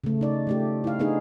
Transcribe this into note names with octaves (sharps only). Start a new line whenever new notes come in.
C#3 A3
D#4 D5
F3 A3 G4
E4 F5
B3 D4 D#4 G#4